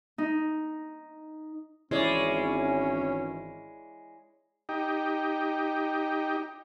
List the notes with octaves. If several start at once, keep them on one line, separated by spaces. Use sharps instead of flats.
D#4
G#1 E3 G#3 C#4 E4 C#5 D5
D#4 G4